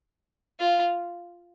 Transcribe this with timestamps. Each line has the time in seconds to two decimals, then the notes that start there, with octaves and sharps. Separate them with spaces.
0.60 F4